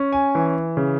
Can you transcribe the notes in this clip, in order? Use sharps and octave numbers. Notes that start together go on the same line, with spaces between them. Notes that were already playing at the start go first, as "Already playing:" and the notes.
Already playing: C#4
G#5
E3
C#3